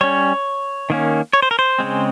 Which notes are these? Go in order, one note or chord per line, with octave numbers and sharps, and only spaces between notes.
G3 C#4 C#5
D#3 A#3 C#4
C#5
C5
A#4
C5
C#3 G#3 C4